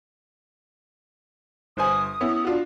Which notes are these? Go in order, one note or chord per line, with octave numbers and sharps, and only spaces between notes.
G1 C5 G#5 D#6
B3 C#4 E4
D4 F4 F#4